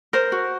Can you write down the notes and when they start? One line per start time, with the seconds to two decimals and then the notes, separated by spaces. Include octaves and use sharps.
0.13 A#4 C5
0.32 F#4